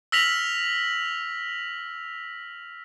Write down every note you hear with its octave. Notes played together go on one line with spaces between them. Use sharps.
E6 F6 A#6 B6 F7 F#7